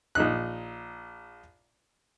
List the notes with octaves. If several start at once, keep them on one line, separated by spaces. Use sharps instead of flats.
A#1 D#4 F#6